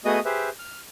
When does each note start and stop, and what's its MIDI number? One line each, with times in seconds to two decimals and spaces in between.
0.05 0.20 57
0.05 0.20 59
0.05 0.20 66
0.05 0.20 68
0.05 0.20 75
0.05 0.20 87
0.25 0.49 67
0.25 0.49 68
0.25 0.49 71
0.25 0.49 72
0.25 0.49 76
0.59 0.80 89